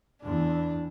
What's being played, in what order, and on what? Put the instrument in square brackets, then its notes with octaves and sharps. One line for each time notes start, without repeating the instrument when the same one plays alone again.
[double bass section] E2 [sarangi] D4